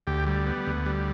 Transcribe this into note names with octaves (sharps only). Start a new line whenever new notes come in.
D2 G4
G3
B3
D2
G3